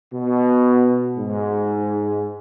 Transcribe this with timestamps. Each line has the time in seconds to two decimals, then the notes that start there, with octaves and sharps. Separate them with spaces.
0.13 B2
1.17 G#2